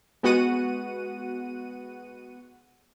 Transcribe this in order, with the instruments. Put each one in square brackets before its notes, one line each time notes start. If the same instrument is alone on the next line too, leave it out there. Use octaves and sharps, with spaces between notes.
[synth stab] G#3 B3 F#4 F#5 D#7